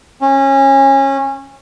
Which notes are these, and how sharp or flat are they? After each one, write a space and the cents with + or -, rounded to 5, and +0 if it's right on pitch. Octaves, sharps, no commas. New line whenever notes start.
C#4 -25